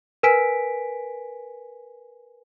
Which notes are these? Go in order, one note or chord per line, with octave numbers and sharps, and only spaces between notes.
A#4 B4 G#5 B6 D7